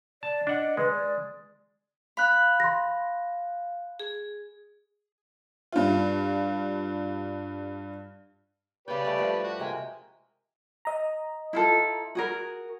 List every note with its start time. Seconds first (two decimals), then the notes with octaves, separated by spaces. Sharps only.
0.23 D5 A5
0.47 D4 D#5 F#5
0.77 G#3 B4
0.91 D5
2.17 F5 B5 F#6
2.60 C6 A#6
4.00 G#4
5.72 G2 F4
8.88 C#3 G4 B4 D5 G5
9.05 G3 A3
9.18 G2 F3 A3
9.44 F#4
9.59 C3 G#3 A#3 G5 G#5
10.85 D#5 A#5
11.53 E4 F4 A4
12.15 F#4 G#4 A#4